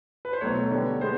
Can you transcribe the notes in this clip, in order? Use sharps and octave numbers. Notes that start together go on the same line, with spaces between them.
B4
C5
B2 F#3 A3 C#5
D3 G3 B3
G#3 B3 C5